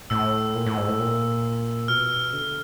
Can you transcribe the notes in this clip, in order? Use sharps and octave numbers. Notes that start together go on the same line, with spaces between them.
A2 E6
A#2
A2
G#2
A2
A#2
B2 F6
D3